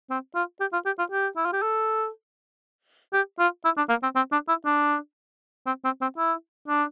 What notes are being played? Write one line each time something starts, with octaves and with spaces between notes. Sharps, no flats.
C4
F4
G4
F4
G4
F4
G4
E4
F4
G4
A4
G4
F4
E4
D4
A#3
C4
C4
D4
E4
D4
C4
C4
C4
E4
D4